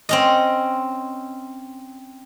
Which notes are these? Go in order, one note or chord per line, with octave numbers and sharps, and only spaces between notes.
C4 C#4 D#5